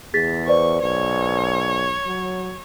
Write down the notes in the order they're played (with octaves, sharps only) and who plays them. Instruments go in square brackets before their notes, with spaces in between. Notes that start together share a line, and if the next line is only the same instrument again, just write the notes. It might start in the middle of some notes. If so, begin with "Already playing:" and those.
[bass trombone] E2 [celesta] G#4 A6 B6
[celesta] B4 C5 D5 [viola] C#6
[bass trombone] B1 [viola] C#5
[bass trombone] F#3